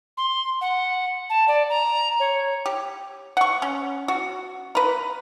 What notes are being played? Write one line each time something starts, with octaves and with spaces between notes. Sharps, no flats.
C6
F#5
A5
D5
A#5
C#5
G4
F#5 C#6
C#4
F#4
A#4 B4